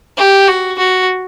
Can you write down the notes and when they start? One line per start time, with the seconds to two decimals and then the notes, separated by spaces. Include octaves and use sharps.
0.18 G4
0.48 F#4
0.78 F#4